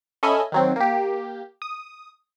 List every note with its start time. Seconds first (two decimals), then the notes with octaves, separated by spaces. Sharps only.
0.23 C#4 A4 D#5 E5 G#5 B5
0.52 D#3 F#3 C4
0.76 A#3 G4
1.62 D#6